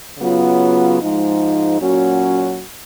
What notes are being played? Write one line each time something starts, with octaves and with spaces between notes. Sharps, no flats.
C#3 F#3 B3 F4
G#2 F3 G#3 D#4
A#2 F#3 C#4 F#4